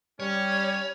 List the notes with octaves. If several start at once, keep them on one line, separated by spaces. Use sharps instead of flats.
G3 C#4 C#5